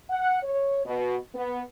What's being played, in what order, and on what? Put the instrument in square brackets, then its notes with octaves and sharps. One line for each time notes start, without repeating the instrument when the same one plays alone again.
[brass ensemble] F#5
C#5
B2
B3